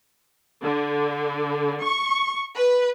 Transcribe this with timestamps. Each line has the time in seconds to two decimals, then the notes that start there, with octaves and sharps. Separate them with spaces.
0.64 D3
1.83 C#6
2.56 B4